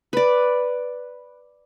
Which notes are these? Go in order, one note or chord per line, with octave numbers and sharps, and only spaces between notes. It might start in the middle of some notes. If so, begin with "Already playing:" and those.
B4 D5